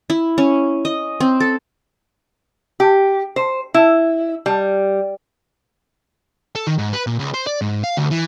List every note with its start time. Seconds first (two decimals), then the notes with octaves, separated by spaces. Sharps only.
0.10 E4
0.38 C#4
0.85 D#5
1.20 C4
1.40 A4
2.80 G4
3.36 C5
3.74 E4
4.46 G3
6.55 A4
6.67 D#3
6.78 G#2
6.93 B4
7.07 A#2
7.19 C#2
7.34 C5
7.47 D5
7.61 G#2
7.84 F5
7.97 D2
8.11 E3